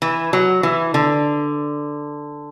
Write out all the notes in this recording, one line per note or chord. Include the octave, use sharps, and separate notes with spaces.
E3
F#3
E3
D3